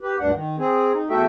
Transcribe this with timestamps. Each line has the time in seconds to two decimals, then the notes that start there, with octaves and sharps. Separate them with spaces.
0.01 G4 B4
0.19 D2 G2 D4 F#5
0.34 D#3
0.59 C4 G#4
0.94 D#4
1.10 E2 A3 F#4 A4 E5 G5